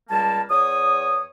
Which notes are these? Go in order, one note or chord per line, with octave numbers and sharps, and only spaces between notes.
C#2 G3 A#3 A5
E2 C#5 D#6